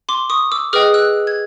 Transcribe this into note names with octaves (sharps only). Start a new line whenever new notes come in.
C6 D6
C#6 D#6
D6 E6
G#4 B4 D#5 G5 D#6 F6
E6 F#6
G#6